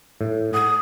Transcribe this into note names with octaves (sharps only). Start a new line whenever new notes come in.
A2
F#5 D#6